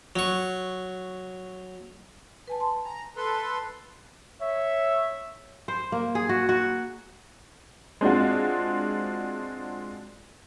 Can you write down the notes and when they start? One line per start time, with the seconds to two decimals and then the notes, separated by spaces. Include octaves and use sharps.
0.16 F#3 C#6
2.48 B4 G#5 A5
2.60 A5 C6
2.85 G#5 A#5
3.17 A4 B4 C6
4.42 C#5 E5
5.68 C5
5.92 A#3
6.15 G#4
6.29 F#4
6.49 F#4
8.01 G#3 C4 D4 F4 F#4